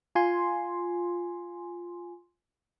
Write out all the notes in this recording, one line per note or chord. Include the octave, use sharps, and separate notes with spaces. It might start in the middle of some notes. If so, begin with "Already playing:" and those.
F4 G#5 C6